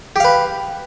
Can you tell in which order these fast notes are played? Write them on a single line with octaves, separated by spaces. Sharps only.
G4 F5 B4